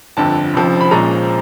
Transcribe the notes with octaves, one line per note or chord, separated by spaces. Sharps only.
G1 F2 D3 A5
F1 F2 C#3 F3
B5
A#1 A#2 F3 G#3 C#4 A#5